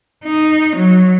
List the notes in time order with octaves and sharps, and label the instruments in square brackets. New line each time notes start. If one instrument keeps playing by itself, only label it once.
[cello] D#4
F#3